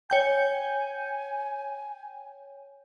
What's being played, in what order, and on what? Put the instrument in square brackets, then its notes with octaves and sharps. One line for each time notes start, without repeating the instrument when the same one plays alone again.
[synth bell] C#5 G5 G6 [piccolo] G#5